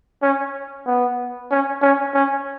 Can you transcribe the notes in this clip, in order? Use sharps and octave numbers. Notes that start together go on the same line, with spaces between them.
C#4
B3
C#4
C#4
C#4